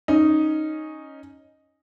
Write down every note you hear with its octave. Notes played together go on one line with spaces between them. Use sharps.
C#4 D#4